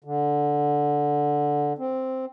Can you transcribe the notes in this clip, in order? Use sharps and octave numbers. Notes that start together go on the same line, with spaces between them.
D3
C4